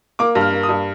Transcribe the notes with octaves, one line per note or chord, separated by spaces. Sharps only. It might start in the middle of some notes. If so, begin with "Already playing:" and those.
A#3 D6
G2
F6
A#3
D#6
G2